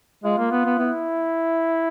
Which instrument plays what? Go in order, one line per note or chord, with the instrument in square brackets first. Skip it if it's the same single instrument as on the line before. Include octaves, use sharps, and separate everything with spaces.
[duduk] G#3 [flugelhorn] F4
[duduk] A#3
B3
B3
[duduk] B3 [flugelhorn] E4